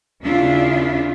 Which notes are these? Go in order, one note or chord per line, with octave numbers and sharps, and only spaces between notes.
D#2 C#3 D4 E4 F4 E5